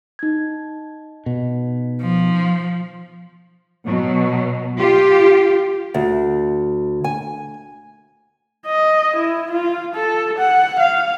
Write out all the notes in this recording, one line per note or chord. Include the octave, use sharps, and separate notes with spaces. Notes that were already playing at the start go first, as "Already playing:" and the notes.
D#4 G#6
B2
F3
B2 F#3
F4 G4
D2
G#5
D#5
E4
F4
A4
F#5
F5